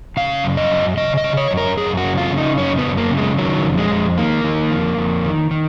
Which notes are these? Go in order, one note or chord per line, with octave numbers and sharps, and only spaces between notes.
C#3 F5
F#2
D#5
F#2
C#3 D#5
D#5
C#3
C#5
F#2
A#4
F#2 G#4
F#4
C#3
F4
C#3
D#4
F#2 C#4
B3
F#2
A#3
C#3
G#3
D#3 F#3
F2
G#3
F2
D#3 A#3
D#3
F2
F2
D#3
D#3